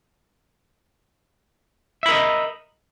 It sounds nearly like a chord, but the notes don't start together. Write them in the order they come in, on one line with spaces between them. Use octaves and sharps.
E5 B5 A#4 D#5